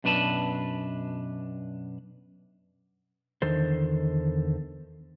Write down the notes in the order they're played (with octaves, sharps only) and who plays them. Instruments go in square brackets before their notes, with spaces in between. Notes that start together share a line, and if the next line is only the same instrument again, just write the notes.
[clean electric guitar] F#2 B2 D4 B4 A5
[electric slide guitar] E2 D3 D#3 A4 C5